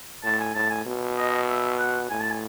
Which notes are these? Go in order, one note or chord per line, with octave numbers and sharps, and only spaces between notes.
A2 A5
G#5
A2 A5
G#5
B2
D#5
E5
F#5
A2 G#5
A5
G#5